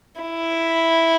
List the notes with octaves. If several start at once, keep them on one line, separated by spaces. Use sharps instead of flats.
E4